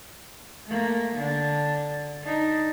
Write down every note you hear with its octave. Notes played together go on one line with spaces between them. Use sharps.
A3 A#3
D3 D4
D4 D#4